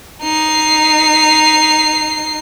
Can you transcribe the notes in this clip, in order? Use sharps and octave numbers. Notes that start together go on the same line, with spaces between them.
D#4 C7